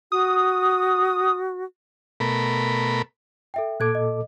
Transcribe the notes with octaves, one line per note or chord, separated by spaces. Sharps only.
F#4 D#6
B2 A3 A#4 B5
A4 E5 G5
A#2 A4 D6 F#6 G#6 D7
D#5